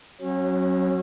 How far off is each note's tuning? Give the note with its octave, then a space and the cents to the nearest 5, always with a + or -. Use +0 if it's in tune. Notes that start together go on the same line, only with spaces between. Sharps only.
F#3 +0 C#4 -30